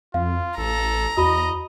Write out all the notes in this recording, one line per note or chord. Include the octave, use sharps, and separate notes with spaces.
F2 F4 F5
A1 A4 A#5
E2 F#4 D#5 B5